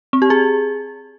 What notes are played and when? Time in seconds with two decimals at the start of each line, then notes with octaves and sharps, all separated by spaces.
0.13 C4
0.22 G4
0.30 G#4